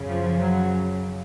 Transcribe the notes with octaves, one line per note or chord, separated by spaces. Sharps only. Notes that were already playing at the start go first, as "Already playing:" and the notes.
Already playing: F#2 C#3
F3
F#3